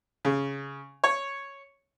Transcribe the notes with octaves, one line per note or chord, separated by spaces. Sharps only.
C#3
C#5